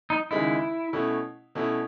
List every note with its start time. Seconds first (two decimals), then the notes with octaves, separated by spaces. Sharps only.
0.10 D#4
0.31 D#2 C#3 G#3 D#4 E4
0.93 B2 A3 C#4 E4
1.55 B2 A3 C#4 E4